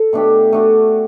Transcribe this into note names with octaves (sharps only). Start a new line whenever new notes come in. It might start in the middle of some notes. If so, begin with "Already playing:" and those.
Already playing: A4
B2 A3 D4 G4
A3 D4 F#4